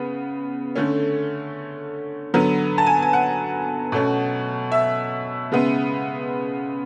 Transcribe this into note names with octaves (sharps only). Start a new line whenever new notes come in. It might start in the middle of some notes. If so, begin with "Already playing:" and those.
Already playing: C#3 B3
D3 A3 C#4
D3 F#3 B3
A5
G#5
G#5
F#5
B2 A3 C#4
E5
C#3 G#3 B3